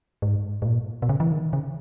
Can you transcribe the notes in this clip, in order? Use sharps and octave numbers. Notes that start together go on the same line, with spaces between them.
G#2
G#2
A#2
B2
C#3
E3
D#3
C#3